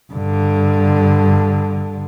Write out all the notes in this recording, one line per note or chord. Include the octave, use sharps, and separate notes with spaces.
G2 D3